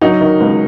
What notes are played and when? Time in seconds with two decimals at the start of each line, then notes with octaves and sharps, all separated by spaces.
0.01 F#3 D#4
0.21 D#3
0.40 C#2